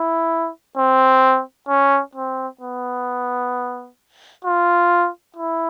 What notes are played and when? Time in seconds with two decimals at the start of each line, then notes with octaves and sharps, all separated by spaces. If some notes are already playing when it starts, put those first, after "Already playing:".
Already playing: E4
0.77 C4
1.69 C#4
2.15 C4
2.61 B3
4.45 F4
5.36 E4